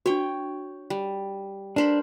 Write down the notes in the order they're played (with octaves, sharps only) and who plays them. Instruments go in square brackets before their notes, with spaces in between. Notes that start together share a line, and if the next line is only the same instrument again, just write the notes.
[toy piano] D4 F#4 [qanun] C#5 G5
[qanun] G3
[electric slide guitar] D4 [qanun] A#4 C5 B5